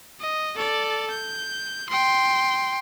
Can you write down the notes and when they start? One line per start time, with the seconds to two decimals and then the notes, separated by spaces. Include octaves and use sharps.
0.20 D#5
0.56 A4 D5
1.10 G6
1.89 G5 C6